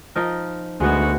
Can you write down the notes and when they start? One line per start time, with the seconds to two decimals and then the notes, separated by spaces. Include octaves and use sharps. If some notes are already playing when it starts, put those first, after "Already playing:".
0.16 F3 D#4 A#4
0.80 D2 G#3 B3 F#4